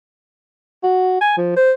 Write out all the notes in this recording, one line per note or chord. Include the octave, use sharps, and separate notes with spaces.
F#4
G#5
F3
C5